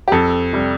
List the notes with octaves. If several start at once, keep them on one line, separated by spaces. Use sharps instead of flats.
G4
F2 A4
C3 G3